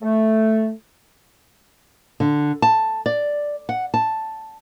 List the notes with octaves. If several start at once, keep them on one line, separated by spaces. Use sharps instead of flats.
A3
D3
A5
D5
F#5
A5